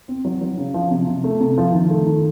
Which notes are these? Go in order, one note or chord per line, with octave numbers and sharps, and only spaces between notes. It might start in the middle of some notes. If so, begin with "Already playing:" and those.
C4
F#3
F#3
C#3
F3
C3
C3
A3
C3
F3
D#3
A3
D#3